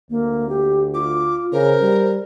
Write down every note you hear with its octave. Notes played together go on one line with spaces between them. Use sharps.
D2 A#3
G4
F4 D6
C#3 A#4 C5
G3